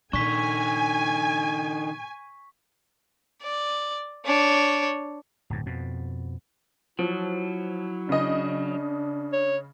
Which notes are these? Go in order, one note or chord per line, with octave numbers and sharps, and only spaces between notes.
A#2 D#3 D4 G#5 C#6 B6
D5
D4 C#5
D1 G2
F2 B2
F3 F#3 E4
C#3 D4 D#5
C#5